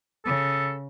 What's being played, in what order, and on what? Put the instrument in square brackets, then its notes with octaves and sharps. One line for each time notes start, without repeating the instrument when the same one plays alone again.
[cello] C#3 [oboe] A4